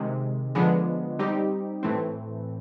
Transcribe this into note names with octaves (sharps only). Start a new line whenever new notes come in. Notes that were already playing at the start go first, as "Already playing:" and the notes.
Already playing: C3 D#3 G#3
D3 F3 G#3 B3 D4
G3 C4 D#4 G4
A2 E3 A3 C4